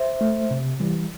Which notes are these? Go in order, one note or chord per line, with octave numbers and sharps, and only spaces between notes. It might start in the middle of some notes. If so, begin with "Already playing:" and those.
Already playing: C5 E5
A3
C3
E3 G3